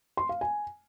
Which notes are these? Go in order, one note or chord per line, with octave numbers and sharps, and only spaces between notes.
C6
F5
G#5